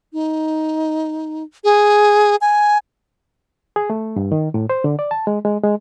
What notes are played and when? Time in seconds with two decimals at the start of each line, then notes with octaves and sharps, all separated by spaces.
0.13 D#4
1.64 G#4
2.41 G#5
3.76 G#4
3.90 A3
4.16 G2
4.32 D#3
4.54 A2
4.70 C5
4.84 D3
4.99 D5
5.11 A5
5.27 G#3
5.45 G#3
5.64 G#3